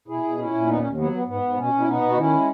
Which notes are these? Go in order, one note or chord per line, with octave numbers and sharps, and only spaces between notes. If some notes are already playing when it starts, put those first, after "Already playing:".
B2 E4 G#4
B2
A#2 C#4 E4
A#2
D#2 B3 D#4
D#2 C#4
F#3 B3
B3
G#2 B3
G#2
B2 C#4
B2
E4
B2 B3 D#4
B2
F#4
D#3 C#4 E4
G#3